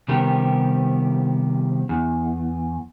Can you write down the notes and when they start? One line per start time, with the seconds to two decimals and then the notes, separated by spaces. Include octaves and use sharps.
0.08 C3 D#3 G3 B3 G4 A#4
1.89 E2